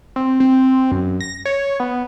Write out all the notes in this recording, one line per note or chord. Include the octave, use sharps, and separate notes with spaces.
C4
C4
F#2
A#6
C#5
B3